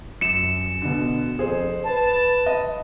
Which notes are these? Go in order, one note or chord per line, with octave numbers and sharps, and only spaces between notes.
F#2 C#7 E7
B2 D3
F2 G#4 C5
B4 A5
D#5